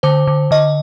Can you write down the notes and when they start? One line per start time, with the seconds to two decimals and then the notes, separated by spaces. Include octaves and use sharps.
0.03 D3 C5
0.27 D3
0.51 D3 D#5